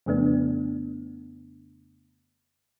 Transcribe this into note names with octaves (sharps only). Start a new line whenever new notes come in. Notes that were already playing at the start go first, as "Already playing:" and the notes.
F2 C#3 A3 B3 D4